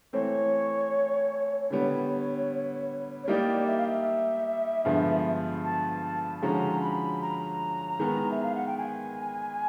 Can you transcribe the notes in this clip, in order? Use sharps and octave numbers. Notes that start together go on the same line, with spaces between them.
E3 A3 C4 C#5
D3 G3 B3 C#5
C#5
G3 A#3 D#4 G4 D5
E5
F5
E5
G2 D3 F3 G#3 B3
A5
D3 F3 G#3 C#4 F#4 A#5
B5
A#5
D#3 G#3 B3
E5
F5
F#5
G5
G#5